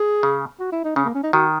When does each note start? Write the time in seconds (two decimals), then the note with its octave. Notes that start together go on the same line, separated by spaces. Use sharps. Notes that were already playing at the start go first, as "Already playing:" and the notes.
Already playing: G#4
0.23 C#3
0.60 F#4
0.72 E4
0.84 D#4
0.96 C#3 C#4
1.05 A#3
1.15 C#4
1.24 D#4
1.33 D#3 F#4